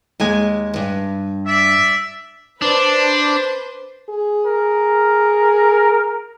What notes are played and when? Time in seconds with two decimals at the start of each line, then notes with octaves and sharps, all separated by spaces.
0.20 D#2 G#3 G#5
0.76 G2
1.47 D5 E5
2.62 D4 B4 C5
4.10 G#4
4.46 A#4